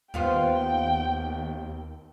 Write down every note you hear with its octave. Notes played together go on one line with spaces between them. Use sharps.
D#2 B3 F4 C5 G5